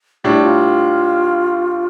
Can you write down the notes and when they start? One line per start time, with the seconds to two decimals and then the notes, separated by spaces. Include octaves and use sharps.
0.24 A2 G3 D4 F4
0.32 E4
0.41 F4